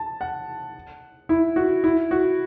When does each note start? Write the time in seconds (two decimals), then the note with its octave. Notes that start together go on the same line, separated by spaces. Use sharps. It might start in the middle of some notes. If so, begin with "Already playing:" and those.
Already playing: A5
0.21 F#5
1.29 E4
1.56 F#4
1.84 E4
2.11 F#4